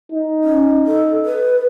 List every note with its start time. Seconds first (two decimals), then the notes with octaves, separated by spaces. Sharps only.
0.12 D#4
0.44 C#4
0.87 A4
1.26 B4